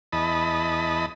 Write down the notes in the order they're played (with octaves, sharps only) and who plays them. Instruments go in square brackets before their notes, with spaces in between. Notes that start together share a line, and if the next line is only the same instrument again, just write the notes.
[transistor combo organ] E2 D#5 A5 B5